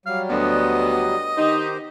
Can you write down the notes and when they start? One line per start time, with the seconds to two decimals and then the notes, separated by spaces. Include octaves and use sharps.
0.06 F#3 G3 F5
0.30 D2 B3 D#5
1.37 D#3 D#4 G4 C5